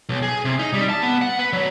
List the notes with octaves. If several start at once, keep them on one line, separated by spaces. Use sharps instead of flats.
B1
G#4
C3
D#4
G3
A5
B3
F#5
B4
F#3